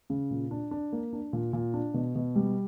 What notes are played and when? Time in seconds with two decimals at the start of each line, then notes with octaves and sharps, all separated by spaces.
0.10 C#3
0.31 A#2
0.51 D4
0.71 D4
0.92 A#3
1.13 D4
1.33 A#2
1.53 A#2
1.74 D4
1.94 B2
2.15 B2
2.36 G3